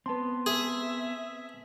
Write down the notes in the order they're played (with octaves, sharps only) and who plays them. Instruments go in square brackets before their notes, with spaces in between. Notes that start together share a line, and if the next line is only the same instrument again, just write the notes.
[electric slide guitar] B3 C4 [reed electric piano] B4 A5 C6
[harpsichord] G#4 [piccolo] E5